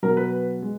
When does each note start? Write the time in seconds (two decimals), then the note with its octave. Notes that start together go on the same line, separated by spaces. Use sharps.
0.03 B2 F#3 A#4
0.17 B4
0.62 G#3